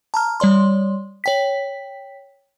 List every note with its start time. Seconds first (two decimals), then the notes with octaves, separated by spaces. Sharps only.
0.14 A5 A#5 F6
0.40 G3 C#5 D5 C6
1.24 C#5 G5 B6